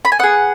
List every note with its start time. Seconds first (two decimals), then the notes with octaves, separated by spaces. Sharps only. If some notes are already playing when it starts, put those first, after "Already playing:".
0.05 B5
0.12 G#5
0.19 B3 G#4 F#5